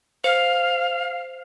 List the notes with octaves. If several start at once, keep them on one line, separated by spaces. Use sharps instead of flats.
C5 F5